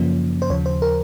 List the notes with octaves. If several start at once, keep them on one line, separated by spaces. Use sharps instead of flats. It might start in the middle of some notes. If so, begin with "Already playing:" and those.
Already playing: F#2 C#3 F3 A#3 C#4
C5
D#2 C#3 F3 C#5
C5
A#4